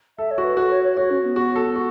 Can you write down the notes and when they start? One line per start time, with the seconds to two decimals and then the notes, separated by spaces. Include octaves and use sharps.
0.18 A4 E5
0.31 C#5
0.38 F#4
0.44 B4
0.57 F#4 A4
0.71 C#5
0.84 C#5
0.97 F#4 C#5
1.10 C#4
1.23 B3
1.36 F#4
1.56 A4
1.76 F#4